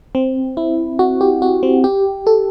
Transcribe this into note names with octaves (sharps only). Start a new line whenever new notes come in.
C4
E4
F#4
G4
F#4
C4
G4
A4